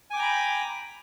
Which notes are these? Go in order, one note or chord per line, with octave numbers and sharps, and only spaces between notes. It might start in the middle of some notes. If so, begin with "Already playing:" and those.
G5 G#5 A#5 B5 D6